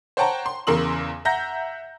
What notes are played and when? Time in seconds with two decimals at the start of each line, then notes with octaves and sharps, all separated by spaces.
0.17 C5 C#5 F#5 G5 A5 A#5
0.46 C6
0.67 E2 C#3 A#4 C6 E6 F#7
1.25 E5 F#5 A#5 G6 A#6